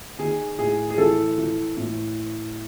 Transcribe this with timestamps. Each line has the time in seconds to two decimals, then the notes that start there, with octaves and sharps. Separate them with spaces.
0.19 D#3 G#4
0.59 A2 G#4
0.90 G#4
0.98 E3 A4
1.38 E3
1.77 A2